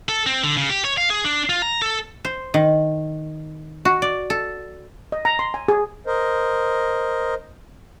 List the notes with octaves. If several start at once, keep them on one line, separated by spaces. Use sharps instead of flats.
A4
C4
D3
C#3
G4
C#5
F5
G#4
D4
F4
A#5
A4
C5
D#3
F#4
D5
A4
D#5
A#5
C6
G#5
G#4
A#4 C5 D#5